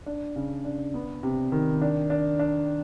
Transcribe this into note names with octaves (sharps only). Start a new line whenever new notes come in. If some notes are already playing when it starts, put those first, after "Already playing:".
D4
C#3
D4
B3
C3
D#3
D4
D4
D4